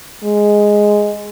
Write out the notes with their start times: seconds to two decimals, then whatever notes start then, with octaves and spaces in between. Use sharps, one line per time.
0.24 G#3